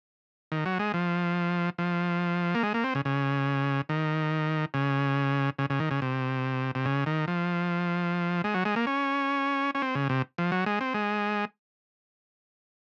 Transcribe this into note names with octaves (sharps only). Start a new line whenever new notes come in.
D#3
F#3
G#3
F3
F3
A#3
G#3
A#3
C4
C#3
C#3
D#3
C#3
C#3
C#3
D#3
C#3
C3
C3
C#3
D#3
F3
G#3
F#3
G#3
A#3
C#4
C#4
C4
C#3
C3
F3
F#3
G#3
C4
G#3